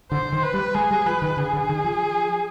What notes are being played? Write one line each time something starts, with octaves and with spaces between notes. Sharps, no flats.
D3 C5
D#3
B4
G3
G#3 G#4
G3
F3 B4
D#3
D3 G#4
D3
D#3
F3